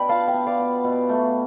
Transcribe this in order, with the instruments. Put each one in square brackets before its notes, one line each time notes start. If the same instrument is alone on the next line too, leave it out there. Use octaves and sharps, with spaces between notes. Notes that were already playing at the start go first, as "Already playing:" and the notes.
Already playing: [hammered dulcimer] B2 D4 [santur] G5 B5
[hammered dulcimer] F4 [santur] F5 A5
[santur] E5 G5
[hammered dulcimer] B3
[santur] D5 F5
[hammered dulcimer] B3
B2
A3